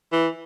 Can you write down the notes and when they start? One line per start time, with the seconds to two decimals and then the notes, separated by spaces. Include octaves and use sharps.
0.12 E3